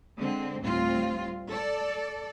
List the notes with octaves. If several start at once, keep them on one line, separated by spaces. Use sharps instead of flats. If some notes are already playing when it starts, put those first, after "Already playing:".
D3 G#3 C4
D2 A2 G3 C4 F4
A4 D5